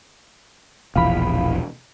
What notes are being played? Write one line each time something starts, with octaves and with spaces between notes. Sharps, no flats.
E1 A#1 E3 F5 B5